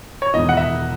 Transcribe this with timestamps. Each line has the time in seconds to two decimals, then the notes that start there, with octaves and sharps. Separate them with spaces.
0.22 C#5
0.34 E1 E2 D#3 D#5
0.49 F#5
0.57 E5